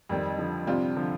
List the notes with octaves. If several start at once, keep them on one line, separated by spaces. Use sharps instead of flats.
F2 D#3 G3 C4
D3 F3
C3 G3 C4 F4
D3 F3